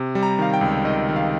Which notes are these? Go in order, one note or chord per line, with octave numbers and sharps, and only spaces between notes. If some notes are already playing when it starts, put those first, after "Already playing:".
Already playing: C3
G3
A#5
D#3 F5
G5
C#2
D#3 D#5
D#3
F5